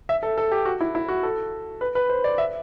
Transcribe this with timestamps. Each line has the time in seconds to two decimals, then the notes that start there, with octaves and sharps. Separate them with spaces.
0.09 E5
0.23 A4
0.38 A4
0.52 G4
0.65 F#4
0.81 E4
0.95 E4
1.08 F#4
1.23 A4
1.81 B4
1.95 B4
2.09 C5
2.24 D5
2.38 E5